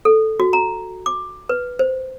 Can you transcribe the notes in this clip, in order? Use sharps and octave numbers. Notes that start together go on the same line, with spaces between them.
A4
F#4
A#5
D6
B4
C5